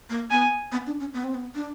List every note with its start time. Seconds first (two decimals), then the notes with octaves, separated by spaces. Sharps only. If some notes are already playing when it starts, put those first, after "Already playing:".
0.10 A#3
0.31 B3 G#5
0.72 B3
0.87 D4
1.00 C#4
1.14 B3
1.24 C4
1.34 B3
1.55 D4